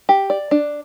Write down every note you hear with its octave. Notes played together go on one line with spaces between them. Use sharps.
G4
D5
D4